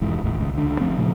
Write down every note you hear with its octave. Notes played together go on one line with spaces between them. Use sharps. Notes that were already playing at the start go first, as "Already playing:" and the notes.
E1 G#2 E3
D#1 G#1 D#2 A2
C#2
C#2 D3
F#1 F3 A3 C4
A#2 C#3 F3